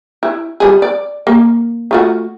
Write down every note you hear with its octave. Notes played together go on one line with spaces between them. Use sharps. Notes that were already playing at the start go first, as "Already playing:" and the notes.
E4
F3 G3 G#4
D5
A#3
A3 F4 F#4